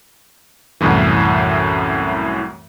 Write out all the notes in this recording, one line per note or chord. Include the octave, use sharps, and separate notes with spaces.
C2 F#2 A2 E3